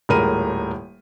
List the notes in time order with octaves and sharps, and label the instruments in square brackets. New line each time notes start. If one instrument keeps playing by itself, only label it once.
[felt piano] D#1 A2 G#3 A#4 B5 D#7